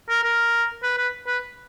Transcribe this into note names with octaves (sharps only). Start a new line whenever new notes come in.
A#4
A#4
B4
B4
B4